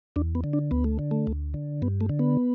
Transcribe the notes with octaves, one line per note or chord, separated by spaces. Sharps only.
E2 D4
B3
D3
D4
D2 B3
A3
D3
A3
D2
D3
G2 B3
A3
D3
B3